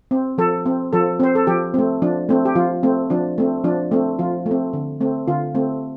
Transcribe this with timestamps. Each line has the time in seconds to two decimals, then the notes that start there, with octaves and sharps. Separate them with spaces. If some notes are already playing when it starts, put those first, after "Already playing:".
0.11 C4
0.38 F3 A4
0.66 C4
0.93 F3 A4
1.20 C4 C5
1.35 A4
1.47 F3 G4
1.74 A3 C4
2.02 F3 D4
2.29 A3 C4
2.45 G4
2.55 F3 F4
2.83 A3 C4
3.10 F3 D4
3.38 A3 C4
3.64 F3 D4
3.91 A3 C4
4.19 F3 F4
4.46 A3
4.51 C4
4.73 D3
5.01 A3 C4
5.27 D3 F4
5.55 A3 C4